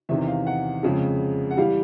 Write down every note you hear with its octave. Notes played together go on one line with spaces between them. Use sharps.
E2 C3 D#3 E5
F5
F#5
F2 C#3 F3 G#3
F#5
E3 G3 F5